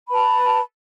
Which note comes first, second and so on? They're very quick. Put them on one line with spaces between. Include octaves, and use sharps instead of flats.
B5 B4 A5